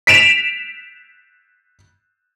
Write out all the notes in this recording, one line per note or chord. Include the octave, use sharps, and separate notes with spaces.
B6 D7 E7 F7